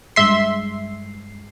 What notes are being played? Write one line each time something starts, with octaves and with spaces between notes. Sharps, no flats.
G2 G#3 E5 C6 C7